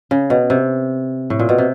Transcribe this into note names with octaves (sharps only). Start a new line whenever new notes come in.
C#3
B2
C3
A2
A#2
B2
C3